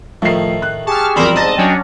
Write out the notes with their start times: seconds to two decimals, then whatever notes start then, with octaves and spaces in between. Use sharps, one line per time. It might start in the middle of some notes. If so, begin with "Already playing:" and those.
0.22 A2 D#3 F3 A3 C7
0.62 F#6
0.87 G4 G#4 A5 C#6 F6
1.16 E1 F2 G3 C4 A#4 C5 B5
1.36 G#2 D#5 A5 A#5 A6 A#6
1.58 F#3 C#4 D4 D#5 G5 G#5